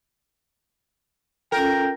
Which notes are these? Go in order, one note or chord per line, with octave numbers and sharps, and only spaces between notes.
C#4 F4 A4 A#4 G5